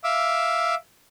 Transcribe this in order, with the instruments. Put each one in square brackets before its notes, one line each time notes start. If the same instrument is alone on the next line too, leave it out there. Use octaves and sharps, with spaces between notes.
[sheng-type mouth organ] E5 F5 D6 E6